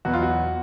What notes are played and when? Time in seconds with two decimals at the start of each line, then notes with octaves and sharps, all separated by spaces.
0.05 E2 B2 F#3 B3 F#4
0.14 F4
0.23 F#4